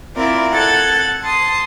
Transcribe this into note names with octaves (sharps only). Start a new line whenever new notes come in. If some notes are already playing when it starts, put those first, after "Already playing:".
C4 E4 F4 A#4 D5
A4 F#5 G#6 A6
A5 C6 D#6